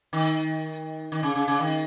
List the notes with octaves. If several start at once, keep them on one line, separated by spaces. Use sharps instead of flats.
D#3
D#3
C#3
C#3
C#3
D#3